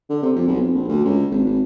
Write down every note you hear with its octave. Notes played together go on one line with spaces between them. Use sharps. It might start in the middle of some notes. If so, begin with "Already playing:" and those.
D3
C3
F2
B1
F2
A#1
D2
C#2
G#1
G#1